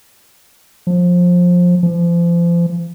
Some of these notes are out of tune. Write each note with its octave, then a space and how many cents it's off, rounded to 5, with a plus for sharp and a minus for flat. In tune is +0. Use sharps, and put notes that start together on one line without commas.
F3 +20
F3 -35